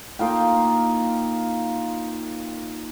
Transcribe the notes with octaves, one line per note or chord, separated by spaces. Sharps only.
A#3 D#4 F4 G5